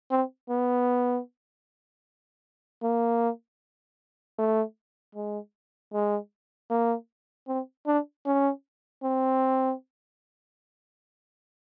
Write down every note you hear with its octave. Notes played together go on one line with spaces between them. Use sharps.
C4
B3
A#3
A3
G#3
G#3
A#3
C4
D4
C#4
C4